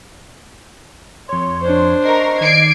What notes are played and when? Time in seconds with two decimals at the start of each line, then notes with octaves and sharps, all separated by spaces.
1.29 F2 C#5 C6
1.61 D4 C5
2.04 A#4 D#5 C#6 A#6 C7
2.41 D#3 D5 G#6 C7 D7